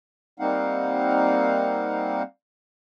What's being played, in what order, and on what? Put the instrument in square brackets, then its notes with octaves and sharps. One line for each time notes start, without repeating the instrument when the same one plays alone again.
[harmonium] G3 A#3 C4 D#4 F5 F#5